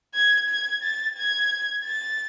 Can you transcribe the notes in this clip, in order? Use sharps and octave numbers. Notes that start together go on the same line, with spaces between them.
G#6
G#6
A6
G#6
A6